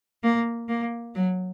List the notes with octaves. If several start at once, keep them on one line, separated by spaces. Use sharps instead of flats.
A#3
A#3
F#3